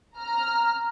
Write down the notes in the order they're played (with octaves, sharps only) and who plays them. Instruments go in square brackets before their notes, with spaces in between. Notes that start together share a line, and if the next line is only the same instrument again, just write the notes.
[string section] A#5 F6